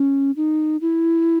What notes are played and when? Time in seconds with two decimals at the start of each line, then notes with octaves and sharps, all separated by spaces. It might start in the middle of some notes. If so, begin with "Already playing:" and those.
Already playing: C#4
0.36 D#4
0.81 E4